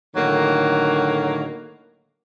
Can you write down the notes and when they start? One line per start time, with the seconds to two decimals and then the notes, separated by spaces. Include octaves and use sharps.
0.16 A2 D3 D#3 F#3 A#3